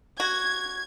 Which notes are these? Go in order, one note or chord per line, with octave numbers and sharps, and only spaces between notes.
F#4 G#6